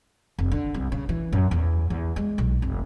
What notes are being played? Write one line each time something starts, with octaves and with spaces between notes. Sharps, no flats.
F1
D3
C2
C#3
E3
F#2
E2
E2
G#3
B1
F1